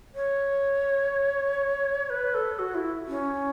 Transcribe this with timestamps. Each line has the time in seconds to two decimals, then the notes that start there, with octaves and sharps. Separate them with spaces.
0.15 C#5
2.10 B4
2.34 A4
2.59 F#4
2.75 E4
3.08 C#4